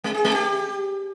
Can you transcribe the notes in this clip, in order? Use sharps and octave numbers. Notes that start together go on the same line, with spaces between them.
G#3
G#4
G#3
G4